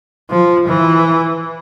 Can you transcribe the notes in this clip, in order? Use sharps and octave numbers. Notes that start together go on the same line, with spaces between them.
F3
E3